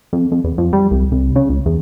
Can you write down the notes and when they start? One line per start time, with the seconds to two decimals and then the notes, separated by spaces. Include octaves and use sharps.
0.13 F2
0.31 F2
0.44 E2
0.58 F2
0.73 G3
0.91 C2
1.12 C2
1.36 C#3
1.49 C#2
1.66 E2